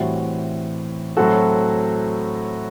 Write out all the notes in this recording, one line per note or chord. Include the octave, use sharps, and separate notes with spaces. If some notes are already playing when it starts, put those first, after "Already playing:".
Already playing: A2 E3 G3 C4 F#4
A2 F#3 C4 F#4 A4